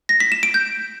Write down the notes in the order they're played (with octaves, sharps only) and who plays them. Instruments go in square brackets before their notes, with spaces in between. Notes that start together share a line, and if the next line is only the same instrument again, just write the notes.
[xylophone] A#6
B6
E7
D7
G6